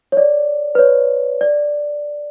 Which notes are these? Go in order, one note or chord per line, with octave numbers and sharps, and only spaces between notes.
C#5
D5
B4
C#5
D5